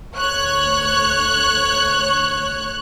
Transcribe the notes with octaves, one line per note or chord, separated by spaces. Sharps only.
D2 C#5 F#6